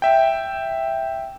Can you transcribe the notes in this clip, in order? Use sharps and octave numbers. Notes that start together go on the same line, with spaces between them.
E5 G5